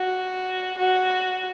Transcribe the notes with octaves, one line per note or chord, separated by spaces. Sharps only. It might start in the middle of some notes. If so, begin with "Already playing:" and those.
Already playing: F#4
F#4